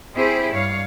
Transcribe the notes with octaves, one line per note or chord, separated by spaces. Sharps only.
C4 E4 G4 G#4 C5
G2 C#5 F5